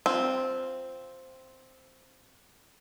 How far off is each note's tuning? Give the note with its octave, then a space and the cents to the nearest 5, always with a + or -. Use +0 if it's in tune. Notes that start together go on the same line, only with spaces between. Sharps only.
C4 +0 F4 +0